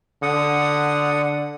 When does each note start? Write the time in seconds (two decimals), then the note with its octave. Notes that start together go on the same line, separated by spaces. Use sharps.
0.23 D3 F#5 D#6